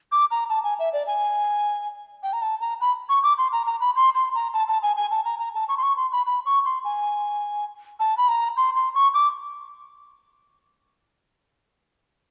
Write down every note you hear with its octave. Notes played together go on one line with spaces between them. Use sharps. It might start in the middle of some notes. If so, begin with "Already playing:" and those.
D6
A#5
A5
G#5
E5
D5
G#5
G5
A#5
A5
A#5
B5
C#6
D6
C6
A#5
A#5
B5
C6
C6
A#5
A5
A5
G#5
G#5
A5
A#5
A#5
A5
C#6
C6
C#6
C6
B5
B5
C#6
C6
G#5
A5
B5
A#5
C6
C6
C#6
D6